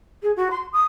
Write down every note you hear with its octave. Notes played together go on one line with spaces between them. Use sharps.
G#4
F#4
C6
D#6